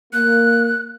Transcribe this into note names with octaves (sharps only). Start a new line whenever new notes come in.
A#3 F#6